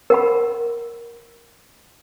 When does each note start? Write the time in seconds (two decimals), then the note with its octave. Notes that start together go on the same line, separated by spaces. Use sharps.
0.10 A#4 F#5 B5